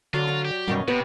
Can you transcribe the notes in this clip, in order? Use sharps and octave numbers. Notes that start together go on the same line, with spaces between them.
D3 F#3 F4 F#4 D5
F#5 A#5
G4
F#2 B2 D#3 G3 C#5 D#5 F5
C3 B3 G4 B4